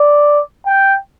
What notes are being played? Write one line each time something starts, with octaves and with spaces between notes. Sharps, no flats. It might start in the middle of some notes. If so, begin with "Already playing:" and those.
Already playing: D5
G5